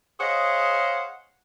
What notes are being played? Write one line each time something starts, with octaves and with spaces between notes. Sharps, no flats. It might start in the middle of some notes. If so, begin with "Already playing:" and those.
G#4 C5 C#5 D#5 F5 F#5